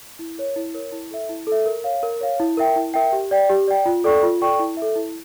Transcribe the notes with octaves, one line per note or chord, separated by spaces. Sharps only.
E4
A#4 C#5
E4
A#4 C#5
E4
A4 E5
E4
A4 E5
A#4
C#5 F5
A#4
C#5 F5
E4
A#4 E5 G5
E4
A#4 E5 G5
G4
D5 G5
G4
D5 G5
F4
A4 D5 G5 C#6
F4
A4 D5 G5 C#6
E4
E5
A4
E4